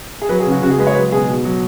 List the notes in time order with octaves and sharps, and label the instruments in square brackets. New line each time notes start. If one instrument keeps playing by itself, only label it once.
[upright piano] G#4
F#3 B4
G#4
C#3
F#4
C#3 F#4
G#4
G#3 B4
C#5
F#3 B4
B2 G#4
B2
F#3